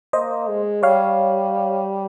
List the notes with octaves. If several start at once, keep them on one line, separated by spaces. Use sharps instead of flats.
A#3 C5 D#5
G#3
G3 C#5 F5